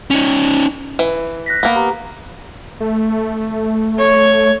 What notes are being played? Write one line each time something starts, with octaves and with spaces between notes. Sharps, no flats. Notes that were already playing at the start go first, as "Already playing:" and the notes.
C#4 D#4
E3
F#6 A#6 B6
A#3 B3
G4 A#5
A3
C#5